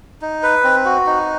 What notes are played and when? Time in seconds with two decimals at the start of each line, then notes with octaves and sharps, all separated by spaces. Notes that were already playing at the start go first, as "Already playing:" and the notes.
0.22 D#4
0.43 B4
0.64 C4
0.85 F#4
1.06 D#4